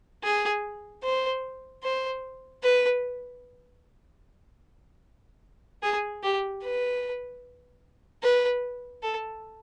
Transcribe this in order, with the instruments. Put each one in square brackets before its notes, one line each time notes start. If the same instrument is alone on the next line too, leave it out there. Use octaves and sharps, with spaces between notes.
[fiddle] G#4
C5
C5
B4
G#4
G4
B4
B4
A4